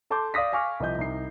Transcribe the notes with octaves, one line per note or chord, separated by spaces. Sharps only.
A4 A5 C6 D6 G6
D5 F5 D#6 A#6 B6
F5 G#5 C#6 D6 F6
C2 F3 D#5 G6
C2 D#4 C7